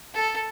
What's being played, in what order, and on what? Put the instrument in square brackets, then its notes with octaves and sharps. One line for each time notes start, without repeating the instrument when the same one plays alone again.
[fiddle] A4